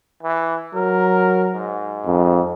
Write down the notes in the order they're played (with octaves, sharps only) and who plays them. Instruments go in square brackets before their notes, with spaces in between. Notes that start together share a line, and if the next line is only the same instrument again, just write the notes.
[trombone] E3
[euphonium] F#3 [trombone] A#4
[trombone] G#2
[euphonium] F2